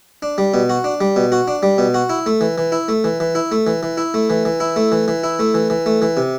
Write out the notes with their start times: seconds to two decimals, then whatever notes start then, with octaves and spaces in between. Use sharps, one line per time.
0.22 D4
0.38 G3
0.54 B2
0.69 F#4
0.84 D4
1.01 G3
1.16 B2
1.32 F#4
1.48 D4
1.63 G3
1.78 B2
1.94 F#4
2.10 E4
2.26 A3
2.41 E3
2.58 E3
2.72 E4
2.88 A3
3.04 E3
3.20 E3
3.35 E4
3.52 A3
3.67 E3
3.83 E3
3.98 E4
4.14 A3
4.30 E3
4.45 E3
4.60 E4
4.76 A3
4.92 E3
5.08 E3
5.24 E4
5.39 A3
5.55 E3
5.70 E3
5.86 A3
6.02 E3
6.17 C3